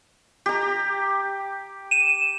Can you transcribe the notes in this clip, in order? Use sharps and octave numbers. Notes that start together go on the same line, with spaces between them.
G4 A#5
D#7 E7